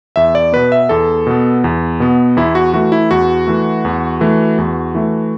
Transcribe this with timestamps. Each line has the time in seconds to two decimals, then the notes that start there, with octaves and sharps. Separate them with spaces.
0.16 E2 E5
0.35 D5
0.52 B2 B3 B4
0.72 E5
0.89 E2 A4
1.27 B2 B3
1.64 E2
2.00 B2 B3
2.37 E2 E4
2.55 F#4
2.74 E3 A3 F#4
2.92 E4
3.11 E2 F#4
3.47 E3 A3
3.85 E2
4.21 E3 A3
4.58 E2
4.95 E3 A3